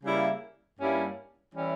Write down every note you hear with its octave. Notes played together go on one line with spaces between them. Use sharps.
C#3 G3 A#3 E4
G2 G3 A#3 C#4 E4
E3 G3 C#4 E4